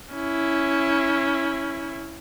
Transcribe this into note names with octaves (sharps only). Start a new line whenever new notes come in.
C#4 E4